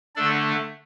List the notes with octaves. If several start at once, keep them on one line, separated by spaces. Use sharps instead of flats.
D3 A3 D4 A4 D5